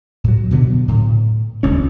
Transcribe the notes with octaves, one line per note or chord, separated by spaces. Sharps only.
A2 F#3
B2 D3 F#3 B3
A2
D#1 C#2 C#4